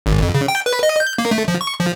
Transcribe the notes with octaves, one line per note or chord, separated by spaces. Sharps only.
G#1
F2
C#3
G5
B4
D#5
G6
A#3
A3
F3
C#6
F3